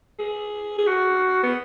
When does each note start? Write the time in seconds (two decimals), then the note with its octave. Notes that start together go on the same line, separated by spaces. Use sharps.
0.19 G#4
0.78 G#4
0.87 F#4
1.43 B3